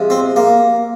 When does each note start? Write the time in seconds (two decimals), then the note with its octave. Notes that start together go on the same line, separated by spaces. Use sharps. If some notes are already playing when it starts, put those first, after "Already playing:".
Already playing: C3 F3 G#3
0.10 C4
0.36 A#3